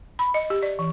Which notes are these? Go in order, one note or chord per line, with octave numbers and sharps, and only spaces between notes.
B5
D#5
G4
D5
E3